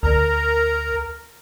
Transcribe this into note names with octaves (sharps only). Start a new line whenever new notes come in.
D2 A#4 A#5